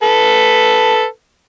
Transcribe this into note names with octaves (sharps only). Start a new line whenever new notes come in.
A4 B4